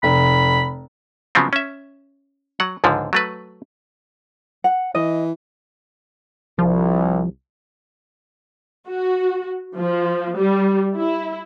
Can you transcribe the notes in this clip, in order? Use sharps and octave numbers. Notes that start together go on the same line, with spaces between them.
F1 B5
C#3 F3 F#3 B3 C4
C#4 E5
F#3 F#5
C#2 G#2 D3 F3
F#3 A3 B4
F#5
E3 D#5
C2 F3
F#4
F3
G3
E4